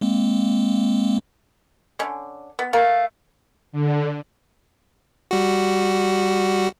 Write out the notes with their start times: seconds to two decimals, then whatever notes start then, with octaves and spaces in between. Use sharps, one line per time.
0.01 G#3 A#3 C4
1.99 D3 C#4
2.59 B3
2.73 A3 A#4 F5
3.72 D3
5.31 G3 F#4